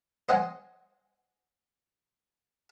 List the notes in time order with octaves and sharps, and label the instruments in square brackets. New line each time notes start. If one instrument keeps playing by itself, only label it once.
[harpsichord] C5 D#5 F#5 G#5